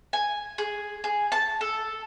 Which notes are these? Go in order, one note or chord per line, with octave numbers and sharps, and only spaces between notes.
G#5
G#4
G#4
A5
A4